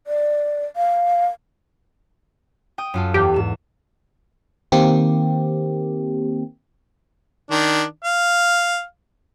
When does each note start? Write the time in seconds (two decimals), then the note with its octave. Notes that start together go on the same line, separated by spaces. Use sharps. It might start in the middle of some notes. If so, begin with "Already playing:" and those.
0.07 D5
0.76 F5
2.78 G5 D#6
2.94 F#2 F4 A4
3.14 E2 G4
3.34 G#2 E7
4.72 D#3 A#3 C4 G4
7.51 D#3 D4
8.04 F5